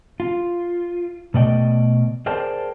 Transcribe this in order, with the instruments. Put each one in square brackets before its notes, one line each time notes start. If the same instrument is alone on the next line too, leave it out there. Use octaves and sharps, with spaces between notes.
[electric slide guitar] F4
B2 A3 D5 D#5 G5
G#4 A#4 C5 D5 G5 A5